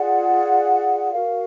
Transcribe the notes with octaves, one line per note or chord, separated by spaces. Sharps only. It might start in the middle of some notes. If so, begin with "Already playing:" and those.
Already playing: F4 G#4 D5 F#5
F#4 A#4 F5